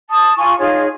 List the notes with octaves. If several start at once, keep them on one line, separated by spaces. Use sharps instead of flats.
A5 D#6
F4 G#5 C#6
D#4 F4 G#4 C#5